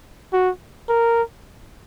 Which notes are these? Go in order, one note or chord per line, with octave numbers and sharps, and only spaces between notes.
F#4
A#4